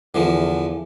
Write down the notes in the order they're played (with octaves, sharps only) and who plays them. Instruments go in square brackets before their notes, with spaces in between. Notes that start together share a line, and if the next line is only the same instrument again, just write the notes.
[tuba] E2 [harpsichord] D3 E3 F3